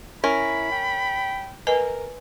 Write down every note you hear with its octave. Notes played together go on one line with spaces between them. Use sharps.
C#4 E4 A#4 B5
G5
A#4 B4 D#5 G#5